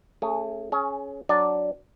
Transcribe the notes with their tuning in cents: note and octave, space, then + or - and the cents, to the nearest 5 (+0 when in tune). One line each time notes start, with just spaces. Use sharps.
A3 +20 C#4 -15 G#4 +0
C#4 +0 G#4 +30
F#3 +0 D4 +0 D5 +0